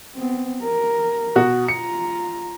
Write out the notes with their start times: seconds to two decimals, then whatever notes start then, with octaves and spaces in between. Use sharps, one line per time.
0.15 B3 C4
0.63 A#4
1.35 B2 F#4
1.68 F4 A#5 C#7